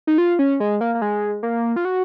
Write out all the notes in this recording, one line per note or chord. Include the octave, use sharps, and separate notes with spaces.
D#4
F4
C#4
G#3
A#3
A#3
G#3
A#3
F4
F#4